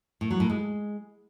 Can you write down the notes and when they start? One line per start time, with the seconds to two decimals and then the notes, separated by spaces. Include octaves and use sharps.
0.21 A2
0.30 F#3
0.40 A2
0.50 G#3